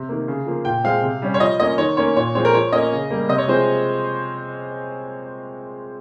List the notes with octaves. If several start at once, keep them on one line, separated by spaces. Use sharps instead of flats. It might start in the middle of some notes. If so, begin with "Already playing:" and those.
Already playing: C3
D#3 A#3
C#3
F3 A#3
A#2 G5
G#3 C4 F5
C3
G3 C#4
C#5
F3 D#5
A#3 C#4 D#5
D#3 C#5
A#3 C#4 C#5
A#2 C#5
F3 G#3 C4 C#5
A#4
F3 C#5
A#3 C#4 D#5
C#3
G3 A#3
C3 D#5
C#5
F3 G#3 C4 C5